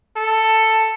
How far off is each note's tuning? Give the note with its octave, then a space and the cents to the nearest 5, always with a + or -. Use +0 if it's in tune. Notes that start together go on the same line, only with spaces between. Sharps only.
A4 +10